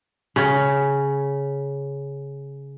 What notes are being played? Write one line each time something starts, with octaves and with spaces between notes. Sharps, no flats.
C#3 C#4